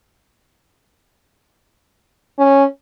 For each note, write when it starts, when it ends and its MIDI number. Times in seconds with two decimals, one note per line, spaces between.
2.39 2.64 61